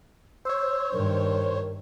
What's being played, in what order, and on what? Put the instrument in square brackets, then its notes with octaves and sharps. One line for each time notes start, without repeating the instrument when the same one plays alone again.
[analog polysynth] C5 C#5 [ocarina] E6
[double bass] G2 D#3 [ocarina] A#4